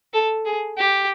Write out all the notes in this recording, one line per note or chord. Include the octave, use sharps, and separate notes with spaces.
A4
G#4
G4